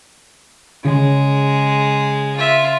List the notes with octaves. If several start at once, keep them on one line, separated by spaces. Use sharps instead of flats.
C#3 G#3
F4 E5